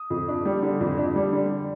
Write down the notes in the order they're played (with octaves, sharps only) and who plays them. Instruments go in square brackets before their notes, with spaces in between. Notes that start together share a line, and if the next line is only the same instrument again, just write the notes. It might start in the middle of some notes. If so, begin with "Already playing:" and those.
Already playing: [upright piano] D#6
F2
D4
G3
D3
F2
D4
G3
D3